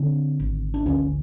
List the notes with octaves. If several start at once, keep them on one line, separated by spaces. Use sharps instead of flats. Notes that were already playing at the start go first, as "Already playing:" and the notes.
Already playing: D3 C4
G#1
D4
D2 C#4